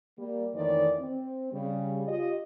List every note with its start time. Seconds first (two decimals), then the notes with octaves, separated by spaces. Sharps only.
0.17 G3 A#3
0.54 F2 D#3 E3 A3 C#5 D5
0.99 C4
1.52 C#3 G3
2.08 F4 G4 D#5